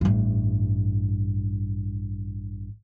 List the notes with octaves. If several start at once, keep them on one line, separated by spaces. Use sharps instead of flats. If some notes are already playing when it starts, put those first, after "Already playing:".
A1 G2